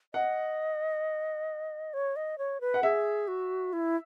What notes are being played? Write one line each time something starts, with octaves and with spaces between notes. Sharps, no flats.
D#5 F#5
C#5
D#5
C#5
B4
F#5
G#4 E5
F#4
E4